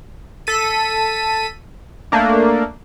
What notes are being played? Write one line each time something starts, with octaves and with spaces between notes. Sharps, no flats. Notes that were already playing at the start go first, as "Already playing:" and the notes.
A4 B6 D#7
A3 A#3 D4